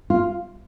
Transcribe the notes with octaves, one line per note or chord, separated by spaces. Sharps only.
F4